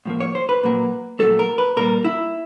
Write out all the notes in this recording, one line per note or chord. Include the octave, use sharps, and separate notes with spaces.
A2 F3 A#3
C#5
C5
B4
A#2 F#3 A#3
A#2 F#3 A3 A4
A#4
B4
A#2 G3 A#3 A#4
E4